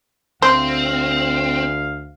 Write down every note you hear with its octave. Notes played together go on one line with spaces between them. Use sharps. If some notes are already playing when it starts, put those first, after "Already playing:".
D2 C4 C5 F5